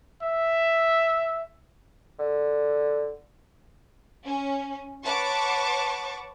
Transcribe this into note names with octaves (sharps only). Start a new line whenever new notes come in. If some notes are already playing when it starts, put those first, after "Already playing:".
E5
D3
C#4
B4 C#5 F#5 A5 C#6 D6